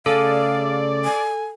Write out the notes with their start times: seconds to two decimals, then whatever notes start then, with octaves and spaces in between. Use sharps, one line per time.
0.06 C#3 A3 G#4 A4 D5 F5
1.04 G#5